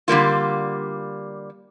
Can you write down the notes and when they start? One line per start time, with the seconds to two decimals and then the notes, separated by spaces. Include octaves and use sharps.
0.08 D3 G3 A#3 F4